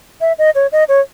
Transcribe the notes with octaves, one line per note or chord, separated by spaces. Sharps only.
E5
D#5
C#5
D#5
C#5